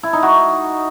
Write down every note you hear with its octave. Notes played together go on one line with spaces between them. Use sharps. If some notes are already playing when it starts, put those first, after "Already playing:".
E4
D#4
F#4